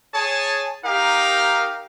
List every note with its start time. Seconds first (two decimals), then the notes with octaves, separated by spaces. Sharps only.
0.13 G#4 C#5 G#5 A5
0.84 D#4 G4 A#4 F5